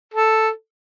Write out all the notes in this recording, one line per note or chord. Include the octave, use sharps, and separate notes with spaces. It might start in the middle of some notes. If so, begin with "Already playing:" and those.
A4